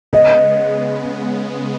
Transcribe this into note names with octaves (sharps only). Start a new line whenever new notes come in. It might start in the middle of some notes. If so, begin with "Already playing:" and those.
C#3 G#3 B3 D#5